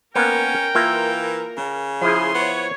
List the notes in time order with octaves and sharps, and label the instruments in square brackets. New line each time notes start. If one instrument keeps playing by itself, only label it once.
[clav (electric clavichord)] A#3 B3 [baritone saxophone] C#4 [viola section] A#4 [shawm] G5
[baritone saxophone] E3 [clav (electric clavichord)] A#3 F4 E5
[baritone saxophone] C#3
[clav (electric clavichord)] F3 E4 [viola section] G#4 [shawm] C6
[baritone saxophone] B3 [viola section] C#5